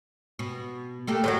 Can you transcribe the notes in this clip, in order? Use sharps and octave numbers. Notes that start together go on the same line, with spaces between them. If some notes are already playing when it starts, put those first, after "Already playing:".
B2
A3 A#3 G4
A2 F3 F#3 A3 F#4